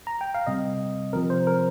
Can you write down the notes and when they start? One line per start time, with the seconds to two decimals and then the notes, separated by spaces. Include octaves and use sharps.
0.07 A#5
0.21 G5
0.35 F5
0.47 C3 G3 C4 D#5
1.13 C3 F3 C4 A#4
1.30 C5
1.47 A#4